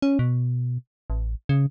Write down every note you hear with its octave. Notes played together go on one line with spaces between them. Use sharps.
C#4
B2
A1
C#3